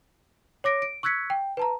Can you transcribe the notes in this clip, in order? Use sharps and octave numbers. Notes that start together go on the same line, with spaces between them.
C#5 D6 A#6 D7
D7
C#6 E6 F#6 G#6 B6 C#7
G5
B4 A5 A#5